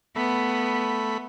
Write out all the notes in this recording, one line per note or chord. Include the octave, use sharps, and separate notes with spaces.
A3 B3 B5